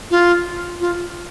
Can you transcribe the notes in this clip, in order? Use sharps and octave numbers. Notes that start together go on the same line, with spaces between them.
F4
F4